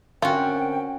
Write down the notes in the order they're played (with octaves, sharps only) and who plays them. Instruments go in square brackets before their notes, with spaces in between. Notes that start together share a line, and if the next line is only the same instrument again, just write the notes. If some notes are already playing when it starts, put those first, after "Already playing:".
[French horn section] D3 C4 A#4 [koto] C#4 F#4 [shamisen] F4 [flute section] G5